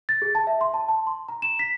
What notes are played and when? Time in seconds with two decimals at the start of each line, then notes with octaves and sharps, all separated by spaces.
0.09 A6
0.22 G#4
0.35 A5
0.47 E5
0.61 C6
0.74 A5
0.89 A5
1.07 C6
1.28 A#5
1.42 E7
1.59 B6